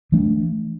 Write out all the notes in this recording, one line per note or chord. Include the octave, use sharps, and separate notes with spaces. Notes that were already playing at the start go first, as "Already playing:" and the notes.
E3 A3 D4